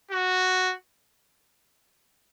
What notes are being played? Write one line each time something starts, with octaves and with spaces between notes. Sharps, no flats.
F#4